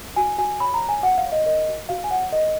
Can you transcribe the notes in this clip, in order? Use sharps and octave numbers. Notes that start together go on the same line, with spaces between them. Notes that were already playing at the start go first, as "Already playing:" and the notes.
F#4 G#5
F#4 G#5
C#5 B5
A#5
C#5
G#5
F#4 F#5
F5
C#5
D#5
A#4 D#5
F#4
F#4 F5
G#5
C#5 F#5
A#4 D#5